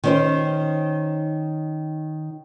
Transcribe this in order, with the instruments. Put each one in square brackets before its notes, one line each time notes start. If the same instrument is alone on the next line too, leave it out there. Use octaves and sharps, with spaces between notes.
[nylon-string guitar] D#3 C#4 C5